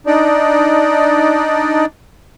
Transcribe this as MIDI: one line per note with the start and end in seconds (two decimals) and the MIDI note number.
0.07 1.85 62
0.07 1.85 63
0.07 1.85 74